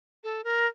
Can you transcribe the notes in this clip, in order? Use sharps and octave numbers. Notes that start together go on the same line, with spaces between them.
A4
A#4